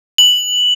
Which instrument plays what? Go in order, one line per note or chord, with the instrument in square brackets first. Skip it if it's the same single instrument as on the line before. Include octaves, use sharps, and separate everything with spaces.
[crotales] F#7